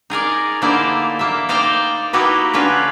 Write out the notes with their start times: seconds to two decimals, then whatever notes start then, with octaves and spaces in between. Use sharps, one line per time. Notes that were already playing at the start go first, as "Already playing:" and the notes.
0.10 D#4 G#4 A#4 D5
0.62 D3 A#3 D#4 E4 C5 D5
1.19 A#3 E5
1.49 D#4 C5 D5 F5 G5
2.13 A#3 D#4 E4 F#4 G4 B4
2.54 D3 C#4 F4 B4